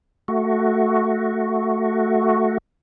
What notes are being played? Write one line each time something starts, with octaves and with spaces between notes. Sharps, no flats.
A3 F#4